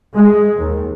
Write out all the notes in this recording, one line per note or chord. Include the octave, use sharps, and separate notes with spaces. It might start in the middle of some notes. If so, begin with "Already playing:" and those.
G#3
D#2